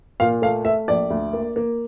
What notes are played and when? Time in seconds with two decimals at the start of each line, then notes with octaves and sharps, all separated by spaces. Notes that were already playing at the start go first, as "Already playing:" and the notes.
0.20 A#2 F5
0.42 A3 F5
0.65 A3 E5
0.88 A#1 D5
1.10 D2
1.33 A#3
1.56 A#3